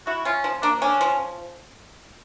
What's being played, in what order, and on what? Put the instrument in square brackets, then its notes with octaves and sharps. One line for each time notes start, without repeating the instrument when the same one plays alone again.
[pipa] E4 [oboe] F#4
[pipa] C#4 [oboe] F4
[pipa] F3
[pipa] A#3 [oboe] D4
[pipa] C#4 [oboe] D4
[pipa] F3